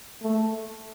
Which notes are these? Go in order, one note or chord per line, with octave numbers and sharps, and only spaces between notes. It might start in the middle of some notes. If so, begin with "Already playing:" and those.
A3